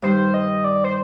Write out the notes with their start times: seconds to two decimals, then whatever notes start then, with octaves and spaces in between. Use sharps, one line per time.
0.02 G2 D#3 G3 C5
0.34 D#5
0.64 D5
0.84 C5